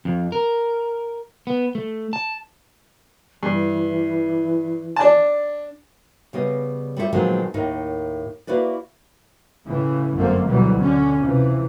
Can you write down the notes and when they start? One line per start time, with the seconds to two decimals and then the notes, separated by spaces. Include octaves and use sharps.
0.05 F2
0.32 A#4
1.47 B3
1.75 A3
2.13 A5
3.43 G2 E3
4.96 D4 A5
6.33 C#3 G3 B3 D#5
6.97 G3 A3 F4 A4 C5 E5
7.13 A#2 D#3 F3 F#3 G#3 B3
7.54 D#2 A2 D#4 A#4
8.47 A#3 E4 F#4 B4 D5
9.65 A2 C#3 E3
10.14 G1 F#2 A3 A#3 C4
10.46 D2 B2 E3 F#3 G3
10.79 D3 C#4
11.20 F2 C3 E3